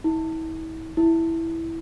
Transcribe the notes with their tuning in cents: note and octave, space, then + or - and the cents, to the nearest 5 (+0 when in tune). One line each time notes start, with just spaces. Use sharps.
E4 -40
E4 -5